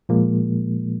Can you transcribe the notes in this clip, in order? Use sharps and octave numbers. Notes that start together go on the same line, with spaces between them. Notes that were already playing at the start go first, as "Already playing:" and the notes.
A#2 F3 G#3 A#3